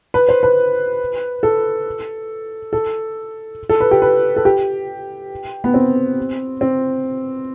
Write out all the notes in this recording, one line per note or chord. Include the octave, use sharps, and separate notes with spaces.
B4
C5
B4
A4
A4
A4
B4
G4
B4
A4
G4
B3
C4
C4